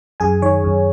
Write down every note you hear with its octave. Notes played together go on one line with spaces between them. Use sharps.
F#2 G#4 G#5
D#3 C#5
F#2